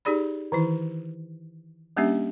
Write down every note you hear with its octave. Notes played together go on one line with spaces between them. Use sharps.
D#4 G4 G#4 D5 B5
D#3 E3 E4
G3 A#3 C#4 D4 G4 E5